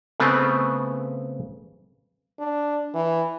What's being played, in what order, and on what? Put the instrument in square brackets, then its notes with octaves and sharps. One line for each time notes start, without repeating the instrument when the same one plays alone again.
[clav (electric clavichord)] C#3 A3 B3 C4 B4
[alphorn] D4
E3